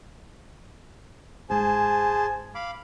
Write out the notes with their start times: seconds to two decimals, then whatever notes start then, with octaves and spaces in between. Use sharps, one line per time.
1.50 G1 G#2 G#4 C5 G#5 A5
2.55 F5 B5 D6